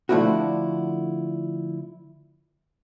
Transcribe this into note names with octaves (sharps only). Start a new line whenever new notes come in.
D3 F3 A3 D4 E4 F#4